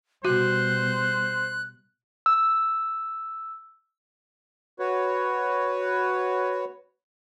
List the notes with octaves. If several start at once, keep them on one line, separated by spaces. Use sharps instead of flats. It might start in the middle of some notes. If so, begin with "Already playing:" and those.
B2 G3 F#4 C5 F#6
E6
F#4 B4 C#5